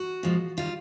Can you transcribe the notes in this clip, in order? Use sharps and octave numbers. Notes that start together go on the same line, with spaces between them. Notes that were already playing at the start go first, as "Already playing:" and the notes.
Already playing: F#4
A#2 F3 G#3
D#3 G3 F4